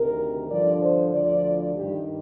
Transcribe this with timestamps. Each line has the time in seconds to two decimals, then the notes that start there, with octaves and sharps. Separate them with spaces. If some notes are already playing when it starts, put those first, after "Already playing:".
Already playing: D2 C3 D#3 A#4
0.50 G2 D3 F3 D5
0.82 C5
1.12 D2 D3 F3 D5
1.75 G2 D#3 G4